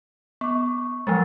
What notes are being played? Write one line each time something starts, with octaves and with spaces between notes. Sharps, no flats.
B3 C#6 D6
F3 F#3 G#3 F#5 E6 A6